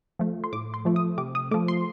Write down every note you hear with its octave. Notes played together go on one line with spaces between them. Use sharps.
F3 A3
C6
A2 D6
C6
F3 A3
D#6
C3 D6
D#6
F3 A3 D6
C6